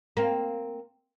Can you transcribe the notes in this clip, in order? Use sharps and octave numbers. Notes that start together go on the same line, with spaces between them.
A#3 C4